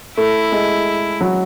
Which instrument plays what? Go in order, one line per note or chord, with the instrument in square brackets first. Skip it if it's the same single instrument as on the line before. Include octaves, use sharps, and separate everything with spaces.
[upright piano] A3 [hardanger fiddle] E4
[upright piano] G#3
F#3